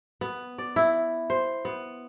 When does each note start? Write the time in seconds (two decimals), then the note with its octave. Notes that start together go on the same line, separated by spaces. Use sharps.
0.21 B3
0.58 D5
0.76 E4
1.30 C5
1.65 B3